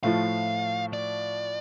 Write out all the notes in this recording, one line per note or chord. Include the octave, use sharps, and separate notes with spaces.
A2 F3 A3 F4 F5
D5